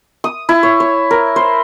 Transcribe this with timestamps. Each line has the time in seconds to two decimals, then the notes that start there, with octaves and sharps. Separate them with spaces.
0.24 D#6
0.49 E4
0.63 C#5
0.80 C#5
1.11 A#4
1.36 C5